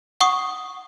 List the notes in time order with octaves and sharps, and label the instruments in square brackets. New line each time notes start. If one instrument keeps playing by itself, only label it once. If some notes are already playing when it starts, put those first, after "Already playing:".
[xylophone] F#5 C#6 D#6